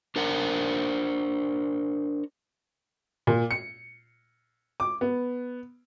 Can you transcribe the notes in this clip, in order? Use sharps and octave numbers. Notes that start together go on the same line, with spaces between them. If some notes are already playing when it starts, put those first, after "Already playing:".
D4 A#4 C5 F#5
A#2
C#7
D6
B3